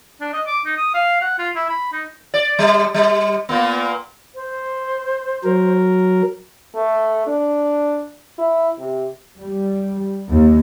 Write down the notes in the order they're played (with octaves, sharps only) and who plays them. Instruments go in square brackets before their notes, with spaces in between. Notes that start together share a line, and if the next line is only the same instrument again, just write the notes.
[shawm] D4
D#5
D6
D#4
D#6
F5
F#5
F4
E4
B5
D#4
[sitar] D5
G3
G3
A#2 A#3 B3
[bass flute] C5
[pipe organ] F#3 A#4
[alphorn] A3
D4
E4
C3
[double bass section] G3
D#2